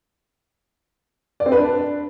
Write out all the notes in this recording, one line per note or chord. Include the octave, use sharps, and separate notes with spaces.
D5
C4
B4
D4